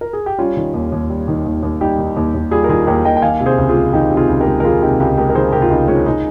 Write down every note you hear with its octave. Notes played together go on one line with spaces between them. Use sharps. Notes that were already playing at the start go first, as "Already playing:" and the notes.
A#4
G#4
G4
G3 C#4 F4
D#3
D#2
D#2
G3
D#3
D#2
D#2
G3 D#4 G4
D#3
D#2
D#2
G3 F4 G#4
A#4
D#3 F4 G#4
D#2 G4 A#4
D#2 D#5 G5
G5
D#3 F5 G#5
C3
G#4 C5
C#2
F4 G#4
G#3
D#3 D#4 G4
C3
F4 G#4
C#2
G4 A#4
G#3
A#4
D#3 F4 G#4
C3 D#4 G4
C#2 D#4 G4
G#3 G4 A#4
A#4
D#3 G#4 C5
C3 G4 A#4
F4
C#2 D#4 G4
G#3 C#4 F4
G#3 D#4